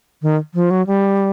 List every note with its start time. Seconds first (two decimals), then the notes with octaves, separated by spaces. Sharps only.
0.22 D#3
0.54 F3
0.71 F#3
0.87 G3